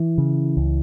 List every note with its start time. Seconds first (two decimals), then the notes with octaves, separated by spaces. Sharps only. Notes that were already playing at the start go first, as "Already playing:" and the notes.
Already playing: E3
0.18 C#3
0.57 C#2